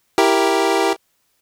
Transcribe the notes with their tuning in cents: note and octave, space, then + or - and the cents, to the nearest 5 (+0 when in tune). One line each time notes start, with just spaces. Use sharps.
E4 +0 G4 +0 A#4 +0